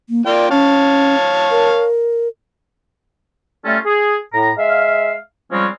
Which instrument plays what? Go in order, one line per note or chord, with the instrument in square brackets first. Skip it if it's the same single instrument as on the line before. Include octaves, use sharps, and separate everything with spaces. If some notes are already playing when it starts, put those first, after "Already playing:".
[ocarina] A#3
[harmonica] A#3 F4 G5 [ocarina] D5
[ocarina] C#4 [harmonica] C#5 F5 A5
[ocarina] A#4
[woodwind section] G3 A3 C#4 F4 A4
G#4
A2 A#5
G#3 E5 F5
F3 G3 G#3 C4 C#4